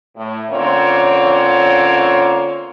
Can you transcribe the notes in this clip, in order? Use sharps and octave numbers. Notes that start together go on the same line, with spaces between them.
A2
D3 A#3 C4 C#4 F4 C#5